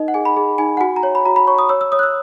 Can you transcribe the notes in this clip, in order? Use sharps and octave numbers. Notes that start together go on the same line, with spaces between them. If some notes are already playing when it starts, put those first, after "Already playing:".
Already playing: D#4 A#4 D#5
F#5
G#4 G#5
B5
G#4
D#4 G#5
F#5
F#4 G#5
A#5
C#5
B5
F#4 A#5
B5
C#5 C#6
D#6
C#5 E6
E6
C#5 D#6
F#6
E6